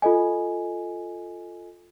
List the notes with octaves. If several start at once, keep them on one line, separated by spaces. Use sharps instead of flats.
F4 A4 D#5 G#5